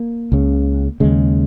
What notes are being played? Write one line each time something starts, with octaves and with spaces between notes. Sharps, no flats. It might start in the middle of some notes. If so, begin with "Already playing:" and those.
Already playing: A#3
C#2 C#3
D#2 C#3 G#3